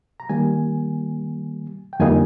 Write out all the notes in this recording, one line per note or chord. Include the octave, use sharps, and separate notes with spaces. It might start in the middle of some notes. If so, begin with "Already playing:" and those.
A#5
D#3 G3 A#3 G#5
G5
F2 D3 G3 A#3 D#4 G#5